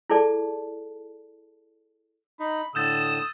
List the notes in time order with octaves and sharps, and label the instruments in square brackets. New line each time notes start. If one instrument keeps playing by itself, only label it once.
[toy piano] E4 G#4 A4 D5 A5
[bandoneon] D#4 [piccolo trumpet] B5
[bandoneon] A2 D3 [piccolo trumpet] D#6 [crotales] E6 G6 A6 [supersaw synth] E7